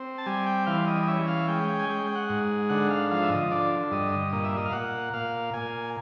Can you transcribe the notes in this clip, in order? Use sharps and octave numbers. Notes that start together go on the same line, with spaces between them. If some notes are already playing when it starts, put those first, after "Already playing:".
Already playing: C4
A5
G3 G#5
G5
E3 F5
D#5
D#5
C#4 E5
F5
G#3 G5
G5
G#5
G#3 G5
G5
F#5
G#2
D3 F#5
F5
F3 F5
E5
D#5
D3 D5
G2 D#5
D#5
A#2 D#5
E5
D#5
F5
A#2 F#5
A#2 F5
A#2 G#5